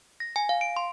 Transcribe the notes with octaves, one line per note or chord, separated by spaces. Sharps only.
A#6
G#5
F5
D7
C6